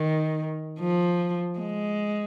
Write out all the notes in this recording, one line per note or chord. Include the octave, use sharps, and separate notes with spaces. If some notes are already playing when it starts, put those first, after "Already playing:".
Already playing: D#3
F3
G#3